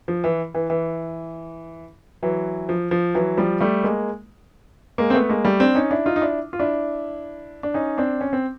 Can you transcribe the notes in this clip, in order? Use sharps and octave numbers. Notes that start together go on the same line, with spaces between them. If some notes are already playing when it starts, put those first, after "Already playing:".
F3
E3
E3
E3
E3 F#3
F3
F3
E3 F#3
F3 G3
G3 A3
G#3 A#3
G#3 A#3
C4
A3 B3
G#3 A#3
G3 A3
C4 D4
C#4 D#4
D4 E4
D#4 F4
D#4
D4 E4
F4
D4 E4
D4
C#4 D#4
C4 D4
C#4
C4